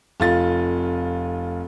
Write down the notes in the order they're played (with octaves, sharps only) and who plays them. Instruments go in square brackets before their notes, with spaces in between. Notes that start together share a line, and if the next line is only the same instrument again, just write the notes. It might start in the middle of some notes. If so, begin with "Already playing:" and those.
[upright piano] F1 F4 A6